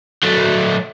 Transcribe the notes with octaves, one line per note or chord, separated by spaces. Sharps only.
F#3 A3